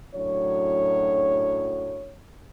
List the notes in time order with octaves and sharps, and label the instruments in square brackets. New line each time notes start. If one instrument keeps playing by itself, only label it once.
[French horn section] F#2 A2 F#3 D4 C#5